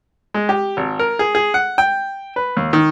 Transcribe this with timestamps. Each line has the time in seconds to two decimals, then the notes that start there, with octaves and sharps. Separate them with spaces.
0.34 G#3
0.49 G4
0.77 G#1
0.99 A#4
1.19 G#4
1.35 G#4
1.54 F#5
1.78 G5
2.36 B4
2.57 D#2
2.73 D#3